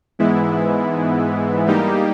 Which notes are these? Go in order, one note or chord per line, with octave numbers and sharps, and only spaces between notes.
G#2 E3 G#3 B3 E4
G3 A#3 D#4 G4